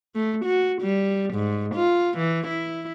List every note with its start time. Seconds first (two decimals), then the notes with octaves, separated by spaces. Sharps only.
0.15 A3
0.45 F#4
0.82 G3
1.34 G#2
1.75 F4
2.18 E3
2.47 E4